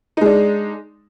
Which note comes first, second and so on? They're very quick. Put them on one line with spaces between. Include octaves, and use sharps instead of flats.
D#4 G#3 D4